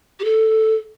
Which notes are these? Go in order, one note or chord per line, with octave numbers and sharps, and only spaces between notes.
G4
A4